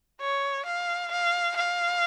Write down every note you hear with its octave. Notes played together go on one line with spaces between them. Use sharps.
C#5
F5
F5
F5